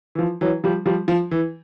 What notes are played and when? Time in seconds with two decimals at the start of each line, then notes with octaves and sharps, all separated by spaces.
0.15 E3
0.19 F3
0.41 E3 F#3
0.64 F3 G3
0.86 F3 G3
1.08 F3
1.31 E3